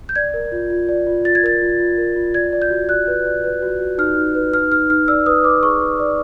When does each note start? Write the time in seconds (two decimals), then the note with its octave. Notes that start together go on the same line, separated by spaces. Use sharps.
0.09 G6
0.16 D5 G#6
0.34 A#4
0.52 F4
0.70 F4
0.89 D5
1.06 F4
1.25 F4 A6
1.35 G#6
1.43 A#4 A6
1.61 F4
1.79 F4
1.98 A#4
2.16 F4
2.34 D5 G#6
2.53 D5
2.62 G6
2.70 F#4
2.89 D5 F#6
3.07 B4
3.26 D5
3.44 B4
3.62 F#4
3.80 F#4
3.98 D#4 F6
4.17 D#4
4.35 B4
4.53 D#4 F6
4.71 D#4 F6
4.90 D#4 F6
5.08 D5 E6
5.26 B4 D#6
5.44 B4 D6
5.63 G#4 C#6
5.81 B4
6.00 D5